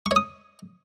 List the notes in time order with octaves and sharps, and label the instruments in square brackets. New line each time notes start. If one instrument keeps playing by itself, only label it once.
[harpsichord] C#6
C#5
D#6